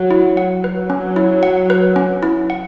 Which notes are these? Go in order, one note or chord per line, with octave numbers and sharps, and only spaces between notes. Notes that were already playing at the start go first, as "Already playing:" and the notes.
Already playing: F#3
E4
F#5
F#3 B4
C#4
E4
F#5
B4
C#4
E4
F#5